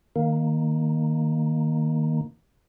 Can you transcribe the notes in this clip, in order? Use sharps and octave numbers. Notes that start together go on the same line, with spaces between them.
D#3 A#3